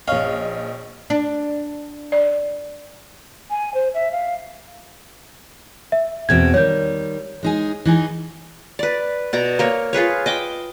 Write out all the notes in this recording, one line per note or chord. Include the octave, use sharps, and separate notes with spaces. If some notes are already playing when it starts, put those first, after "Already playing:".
A#1 C#4 D#5 F5
D4
D5
G#5
C5
E5
F5
E5
E2 B2 C4 G#6
D#3 G3 C#5 G6
G#3 D#4 G#4
E3 D#4 G#4
B4 D5
B2 D5 A#5
A#3 A#4 C#5
F4 G#4 B4 C#5
D#5 G5 D6